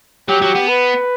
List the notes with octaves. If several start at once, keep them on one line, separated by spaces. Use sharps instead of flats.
F#3 G4
F#3
B3
B4